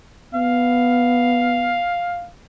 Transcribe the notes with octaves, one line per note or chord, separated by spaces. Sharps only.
B3 F5